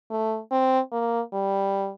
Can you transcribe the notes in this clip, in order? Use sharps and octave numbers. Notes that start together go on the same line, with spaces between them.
A3
C4
A#3
G3